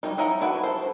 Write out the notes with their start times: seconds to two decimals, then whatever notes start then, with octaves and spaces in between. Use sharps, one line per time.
0.03 F#3 G3 D#4
0.18 D#4 E4 F#5 A#5
0.41 D4 E4 F#4 B4
0.63 A4 C5